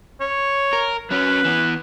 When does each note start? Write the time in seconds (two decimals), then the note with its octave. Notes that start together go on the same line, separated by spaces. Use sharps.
0.21 C#5
0.73 A#4
1.11 F#3 C#4 B4
1.44 E3 B3